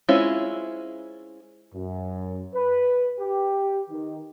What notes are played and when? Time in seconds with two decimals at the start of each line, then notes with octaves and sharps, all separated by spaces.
0.09 G#3 C4 C#4 E4 F4
1.74 F#2
2.55 B4
3.19 G4
3.90 D#3